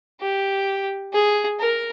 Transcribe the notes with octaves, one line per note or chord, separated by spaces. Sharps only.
G4
G#4
A#4